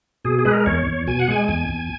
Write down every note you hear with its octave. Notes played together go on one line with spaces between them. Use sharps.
B2 G#4
G#4
G#3 B4
A#4
E2 C#5
E2
B2 G#5
F#5
G#3 G#5
E2 G#5
E2